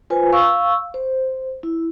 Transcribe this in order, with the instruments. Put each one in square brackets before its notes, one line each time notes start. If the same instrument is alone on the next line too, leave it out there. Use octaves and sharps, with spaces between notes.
[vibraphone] F4 B4 C5 G#5
F5 C#6 E6
C5
E4